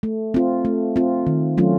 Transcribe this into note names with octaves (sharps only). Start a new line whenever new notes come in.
A3
C4 F4
A3
C4 F4
D#3
F#3 A3 C#4 F4